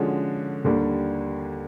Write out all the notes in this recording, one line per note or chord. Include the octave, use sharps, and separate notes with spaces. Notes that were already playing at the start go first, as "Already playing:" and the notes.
Already playing: D3 F3 G#3 C#4 F#4
D#2 D3 G3 A#3 D4